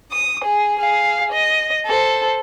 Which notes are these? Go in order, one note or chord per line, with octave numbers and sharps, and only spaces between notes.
D#6
G#4
G#4 F5
D#5
A4 C5